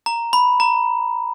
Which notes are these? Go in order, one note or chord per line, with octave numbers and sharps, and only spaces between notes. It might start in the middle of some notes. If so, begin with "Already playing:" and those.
A#5
B5
A#5